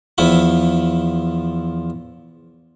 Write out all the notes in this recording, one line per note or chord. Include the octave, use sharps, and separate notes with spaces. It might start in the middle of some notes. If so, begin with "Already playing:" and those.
E2 F3 E4 F4 B5